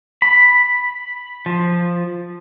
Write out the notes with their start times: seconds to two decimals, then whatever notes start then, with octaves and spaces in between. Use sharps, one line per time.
0.22 B5
1.46 F3